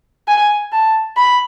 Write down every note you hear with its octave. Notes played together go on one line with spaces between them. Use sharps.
G#5
A5
B5